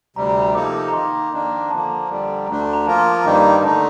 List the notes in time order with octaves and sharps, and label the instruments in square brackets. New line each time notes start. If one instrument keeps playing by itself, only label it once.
[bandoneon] D2 C3 G3 [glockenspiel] A#5
[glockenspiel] A#5
A#5
[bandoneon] C3 F3 A#3 D#4 A4 [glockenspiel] D6
[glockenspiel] A#5
[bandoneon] D#3 A#3 D#4 [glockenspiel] C6
[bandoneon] F2 D#3 A#3 D4
[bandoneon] D3 F3 A#3 [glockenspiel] A5
[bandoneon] F2 D3 G3
[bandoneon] D2 D3 A3 D4 [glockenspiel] A#5
[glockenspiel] A5
A#5
[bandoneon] F3 A#3 F4 A#4 [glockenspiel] A5
[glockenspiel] C6
D6
[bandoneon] G2 D#3 G3 A#3 D#4 [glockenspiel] C6
[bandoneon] D3 A3 D#4 [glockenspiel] A5